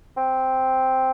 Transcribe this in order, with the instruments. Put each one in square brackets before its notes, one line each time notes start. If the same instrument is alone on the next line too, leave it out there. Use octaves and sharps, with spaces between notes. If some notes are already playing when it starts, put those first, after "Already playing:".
[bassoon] C4